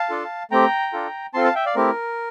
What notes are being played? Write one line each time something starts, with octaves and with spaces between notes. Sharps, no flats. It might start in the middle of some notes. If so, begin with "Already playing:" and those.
Already playing: F5 A5
D4 F4 A4
A3 C4 G4 G5 A#5
D4 F4 A4
C4 F4 A4 A5 C6
F5 A5
E5 G5
D5 F5
A3 C4 E4 G4 A#4